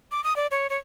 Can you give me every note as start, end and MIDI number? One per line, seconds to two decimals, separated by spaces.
0.11 0.23 86
0.24 0.36 87
0.36 0.47 74
0.51 0.67 73
0.70 0.77 73